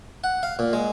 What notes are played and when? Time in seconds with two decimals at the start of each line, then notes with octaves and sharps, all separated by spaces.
0.24 F#5
0.43 F5
0.59 A#2
0.73 G#3